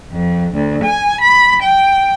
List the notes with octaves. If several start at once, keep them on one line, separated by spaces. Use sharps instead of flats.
F2
D2
G#5
B5
G5